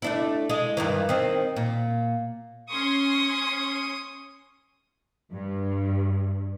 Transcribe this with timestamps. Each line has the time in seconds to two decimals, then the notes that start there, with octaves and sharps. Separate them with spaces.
0.02 A3 D4 E4
0.50 G#3
0.77 G2 D#3 E3
1.09 D#3 C4
1.56 A#2
2.70 C#4 C6 C#6 D#6
5.32 G2